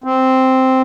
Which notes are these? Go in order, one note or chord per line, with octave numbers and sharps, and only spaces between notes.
C4